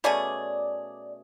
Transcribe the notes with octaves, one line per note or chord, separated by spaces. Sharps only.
B2 A3 C#4 G#4 D5